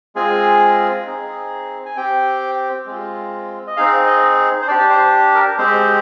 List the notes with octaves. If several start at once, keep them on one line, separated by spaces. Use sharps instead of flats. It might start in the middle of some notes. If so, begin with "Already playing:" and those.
G#3 C4 F4 G#4 G#5
C4 D#4 G#4
G#5
C4 G4 G5
G#3 C4 F4
D#5
C4 D#4 G#4 F5
D#5
C5
D4 G4 D5
C5
A#4
G#3 C4 G4 C5